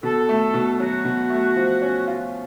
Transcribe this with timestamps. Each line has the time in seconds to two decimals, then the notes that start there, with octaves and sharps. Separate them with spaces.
0.03 B2 A4
0.29 A3
0.54 B2
0.80 F#3 F#4
1.05 B2
1.30 A3
1.56 F3
1.82 C#4
2.08 F4